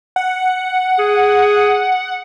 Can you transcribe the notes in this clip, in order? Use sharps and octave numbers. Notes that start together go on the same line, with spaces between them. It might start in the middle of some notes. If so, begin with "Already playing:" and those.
F#5
G#4